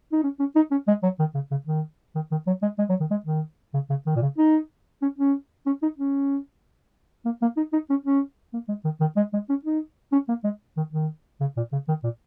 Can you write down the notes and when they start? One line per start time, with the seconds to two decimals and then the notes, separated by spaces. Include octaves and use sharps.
0.12 D#4
0.23 C#4
0.39 C#4
0.56 D#4
0.71 C#4
0.88 G#3
1.03 F#3
1.19 D#3
1.34 C#3
1.51 C#3
1.66 D#3
2.15 D#3
2.31 D#3
2.47 F#3
2.62 G#3
2.78 G#3
2.89 F#3
3.00 D#3
3.10 G#3
3.26 D#3
3.74 C#3
3.90 C#3
4.06 D#3
4.16 A#2
4.22 C#3
4.38 D#4
5.02 C#4
5.18 C#4
5.66 C#4
5.82 D#4
5.98 C#4
7.25 A#3
7.42 A#3
7.57 D#4
7.73 D#4
7.90 C#4
8.05 C#4
8.53 A#3
8.68 G#3
8.84 D#3
9.00 D#3
9.16 G#3
9.33 G#3
9.49 C#4
9.65 D#4
10.12 C#4
10.29 A#3
10.44 G#3
10.77 D#3
10.93 D#3
11.40 C#3
11.57 A#2
11.72 C#3
11.88 D#3
12.03 A#2